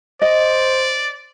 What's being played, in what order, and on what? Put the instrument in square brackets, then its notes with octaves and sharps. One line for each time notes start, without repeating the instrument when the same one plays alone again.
[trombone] C5 [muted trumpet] D5 [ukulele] D#5